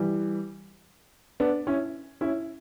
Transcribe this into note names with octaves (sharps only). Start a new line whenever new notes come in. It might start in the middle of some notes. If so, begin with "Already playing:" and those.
Already playing: E3 G3
B3 D4
C#4 E4
C#4 E4